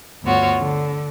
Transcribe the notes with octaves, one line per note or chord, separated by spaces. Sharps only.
D2 G2 B3 F4 F#4 C#5
D3